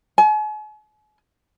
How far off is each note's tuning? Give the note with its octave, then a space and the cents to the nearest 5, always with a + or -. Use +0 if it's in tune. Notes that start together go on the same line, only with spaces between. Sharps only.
G#5 +45